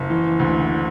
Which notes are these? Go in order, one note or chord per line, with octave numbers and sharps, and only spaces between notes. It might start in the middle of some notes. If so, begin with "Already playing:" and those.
Already playing: F#1
E3
D2